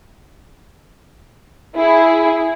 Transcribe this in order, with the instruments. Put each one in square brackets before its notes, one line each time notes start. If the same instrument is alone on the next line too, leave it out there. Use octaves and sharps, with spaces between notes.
[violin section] E4 G#4